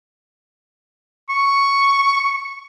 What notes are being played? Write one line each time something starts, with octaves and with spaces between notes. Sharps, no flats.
C#6